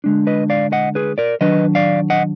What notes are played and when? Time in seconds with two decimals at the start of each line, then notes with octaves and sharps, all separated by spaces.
0.04 D3 G#3 D4
0.27 B4 D#5
0.50 D5 F5
0.72 D#5 F#5
0.95 G#4 B4
1.18 A#4 D5
1.41 D#3 F#3 D4 B4 D#5
1.75 D5 F5
2.10 D#5 F#5